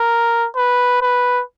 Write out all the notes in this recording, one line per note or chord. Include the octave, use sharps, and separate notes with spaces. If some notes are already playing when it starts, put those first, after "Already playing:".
Already playing: A#4
B4
B4